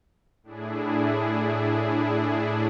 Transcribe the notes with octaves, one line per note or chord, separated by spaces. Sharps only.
A2 D4 E4 G#4